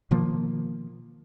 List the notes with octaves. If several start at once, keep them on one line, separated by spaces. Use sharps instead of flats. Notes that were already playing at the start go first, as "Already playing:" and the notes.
B2 D#3 F3 A#3